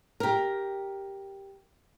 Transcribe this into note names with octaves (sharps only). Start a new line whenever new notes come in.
G4 A#4